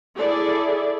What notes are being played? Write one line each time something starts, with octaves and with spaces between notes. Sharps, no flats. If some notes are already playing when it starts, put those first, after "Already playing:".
E4 G#4 A4 D5